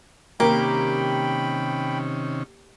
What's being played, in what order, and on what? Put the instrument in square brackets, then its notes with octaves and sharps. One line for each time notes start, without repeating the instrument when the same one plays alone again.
[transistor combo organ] C3 D#3 C#4 [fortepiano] A#3 [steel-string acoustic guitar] G4 [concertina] G5 B5